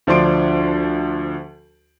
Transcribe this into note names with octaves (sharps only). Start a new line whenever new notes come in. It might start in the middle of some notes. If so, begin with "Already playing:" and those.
D2 F3 D4 C6 D7